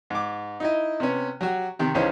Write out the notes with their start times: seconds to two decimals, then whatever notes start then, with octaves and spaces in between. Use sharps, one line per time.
0.10 G#2 D6
0.60 D#4 E4 D#5
1.00 C3 B3 C#4
1.41 F#3 F#4 G4
1.79 C3 D#3 G4
1.94 C#2 C#3 E3 C#4 D#4 C5